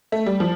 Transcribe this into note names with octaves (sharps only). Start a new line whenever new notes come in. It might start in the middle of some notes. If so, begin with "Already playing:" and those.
A3
G3
F3